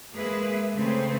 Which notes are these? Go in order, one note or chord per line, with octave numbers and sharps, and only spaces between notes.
G#3 A#3 G#4 B4 E5
C#3 A3 C4 B4 C5